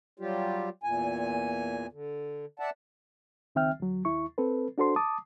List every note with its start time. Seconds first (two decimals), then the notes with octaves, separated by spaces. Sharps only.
0.20 F#3 G3 F4 G4
0.83 E2 A#2 G#5
1.92 D3
2.59 D5 E5 F#5 A5
3.55 C#2 D#3 C4 E5 G5 F6
3.80 D2 F#3
4.05 D#2 E4 C#6
4.38 C4 A4 B4
4.78 D4 F#4 A4 C5 C6
4.96 A5 D6 D#6